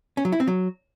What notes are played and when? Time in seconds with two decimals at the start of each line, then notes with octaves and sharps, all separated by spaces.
0.17 C#4
0.25 F#3
0.32 E4
0.40 C4
0.48 F#3